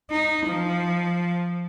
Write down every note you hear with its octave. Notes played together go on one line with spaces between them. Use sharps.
D#4
F3